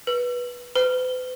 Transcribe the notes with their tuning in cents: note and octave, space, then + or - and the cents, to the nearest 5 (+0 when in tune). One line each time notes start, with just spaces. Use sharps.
B4 -15
B4 +45